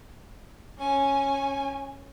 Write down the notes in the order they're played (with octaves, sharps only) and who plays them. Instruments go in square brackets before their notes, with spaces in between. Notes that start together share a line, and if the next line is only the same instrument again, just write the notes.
[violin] C#4 G#5